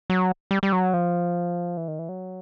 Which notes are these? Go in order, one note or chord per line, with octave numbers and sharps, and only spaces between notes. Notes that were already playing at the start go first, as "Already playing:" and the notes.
F#3
G3
G3
F#3
F3
E3
D#3
E3
F#3